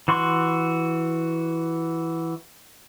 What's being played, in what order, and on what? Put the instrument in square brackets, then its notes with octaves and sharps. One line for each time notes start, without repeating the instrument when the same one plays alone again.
[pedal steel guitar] E3 F#4 C6 C#6